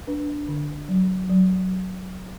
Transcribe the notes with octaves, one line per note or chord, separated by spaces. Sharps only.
D4 B4
D3
F#3
F#3